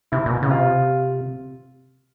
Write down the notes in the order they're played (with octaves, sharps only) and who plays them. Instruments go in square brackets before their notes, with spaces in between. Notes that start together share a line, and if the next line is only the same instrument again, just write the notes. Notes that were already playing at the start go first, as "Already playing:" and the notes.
[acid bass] C3 [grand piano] E4
[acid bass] A#2
B2
C#3
[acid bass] C3 [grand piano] F4